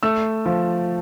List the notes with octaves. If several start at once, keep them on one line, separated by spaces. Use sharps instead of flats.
A3 E6
F3